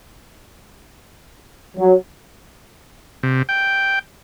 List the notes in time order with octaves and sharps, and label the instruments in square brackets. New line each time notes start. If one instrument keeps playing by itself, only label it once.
[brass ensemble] F#3
[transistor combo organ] C3
G5